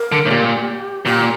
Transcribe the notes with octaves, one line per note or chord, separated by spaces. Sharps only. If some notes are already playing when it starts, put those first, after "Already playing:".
Already playing: A#4
D3
A2
A#2 G4
A#2 G4